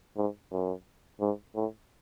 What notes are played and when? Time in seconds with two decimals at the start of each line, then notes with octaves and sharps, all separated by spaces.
0.17 G#2
0.51 F#2
1.20 G#2
1.56 A2